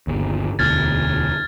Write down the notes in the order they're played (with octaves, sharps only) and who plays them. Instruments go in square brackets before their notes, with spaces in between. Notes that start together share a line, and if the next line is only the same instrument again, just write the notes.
[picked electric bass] G1 D#2
[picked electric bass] E1 D2 [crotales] F6 G#6 A6